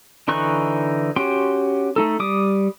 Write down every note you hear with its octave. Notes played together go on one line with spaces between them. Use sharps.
D3 E3 D#4 C#6 F#6
C#4 F#4 G4 G5 C6
A3 D#4 A4
G3 D6 D#6